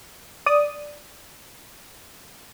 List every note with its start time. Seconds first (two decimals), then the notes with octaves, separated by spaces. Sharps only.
0.46 D5 D#6